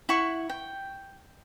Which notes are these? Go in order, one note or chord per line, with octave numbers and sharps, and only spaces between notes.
E4 F#5 C#6
G5